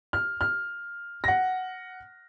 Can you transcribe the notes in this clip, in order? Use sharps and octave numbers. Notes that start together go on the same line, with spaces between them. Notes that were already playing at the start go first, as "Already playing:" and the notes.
F6
F6
F#5 A#6